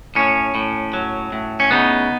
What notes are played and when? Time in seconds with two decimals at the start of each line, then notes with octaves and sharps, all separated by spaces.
0.15 A2 C#4
0.55 A2
0.93 F#3
1.32 A2
1.60 C#4
1.71 C#3 B3 D#4